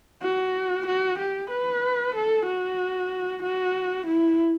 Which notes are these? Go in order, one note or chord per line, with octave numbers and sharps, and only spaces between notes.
F#4
F#4
G4
B4
A4
F#4
F#4
E4